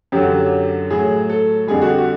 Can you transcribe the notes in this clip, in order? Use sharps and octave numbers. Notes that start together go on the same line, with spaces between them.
F#2 D3 F#3 G4
A2 F#3 G#4
A4
F2 D3 G3 G#4
F#4
G4
F#4